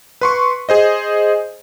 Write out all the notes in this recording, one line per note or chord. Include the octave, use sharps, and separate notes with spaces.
B4 C6 C#6
G#4 C5 D#5